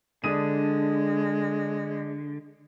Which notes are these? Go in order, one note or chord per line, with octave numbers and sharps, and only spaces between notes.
D3 G#3 D4 D#6 D#7